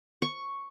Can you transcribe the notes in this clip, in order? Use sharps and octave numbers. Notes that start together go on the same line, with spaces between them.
C#6